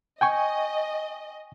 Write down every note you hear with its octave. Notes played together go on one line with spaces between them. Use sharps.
D#5 G5 G#5 C#6